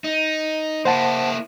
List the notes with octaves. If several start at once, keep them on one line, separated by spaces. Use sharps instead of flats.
D#4
A#3 E4 C5 F#5 A5